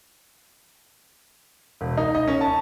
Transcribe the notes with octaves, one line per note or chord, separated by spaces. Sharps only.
E1
D#4
D#5
C#4
A5